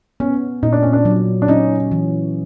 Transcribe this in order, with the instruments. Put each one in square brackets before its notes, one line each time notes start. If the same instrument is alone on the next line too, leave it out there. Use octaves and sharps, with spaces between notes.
[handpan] B3 [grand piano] C#4
[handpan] A#2 [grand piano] D#4
[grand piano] D4
C#4
D4
[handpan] F#3
[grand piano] D4
[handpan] C#4 [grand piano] D#4
[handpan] E3